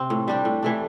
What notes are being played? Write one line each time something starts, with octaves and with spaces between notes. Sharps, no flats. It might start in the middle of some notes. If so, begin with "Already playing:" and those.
Already playing: C3 C4
A2
G3 D4 G4
A2
E3 A3 D4